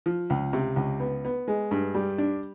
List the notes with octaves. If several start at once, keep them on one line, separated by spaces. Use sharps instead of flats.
F3
C#2
C3
C#2
B3
B3
G#3
G2
G3
D4